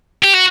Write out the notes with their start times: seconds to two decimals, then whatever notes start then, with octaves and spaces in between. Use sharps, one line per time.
0.23 G4
0.33 F#4